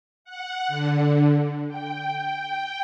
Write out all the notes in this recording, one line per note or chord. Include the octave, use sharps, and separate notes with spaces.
F#5
D3
G5